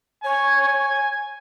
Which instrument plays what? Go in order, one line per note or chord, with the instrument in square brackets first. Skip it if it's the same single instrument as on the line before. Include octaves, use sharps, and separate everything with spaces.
[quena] C#5 [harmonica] G#5